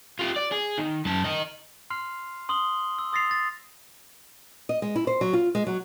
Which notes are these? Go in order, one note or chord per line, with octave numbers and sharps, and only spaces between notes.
F4 G4
D5
G#4
D#3
F#2 A5
D#3 D#5
C6 F6 C7 F7
C6 D#6 F#7 G7
E6
C6 D#6 A6 A#6 C7 F7
A6
D#5
G#3
E4
C5
F#3
F4
G#3
F#3